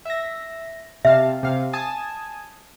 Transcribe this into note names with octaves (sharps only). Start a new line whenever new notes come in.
E5 A#6
C3 E5 F5 A5
C3 F5
G#5 A5 D#6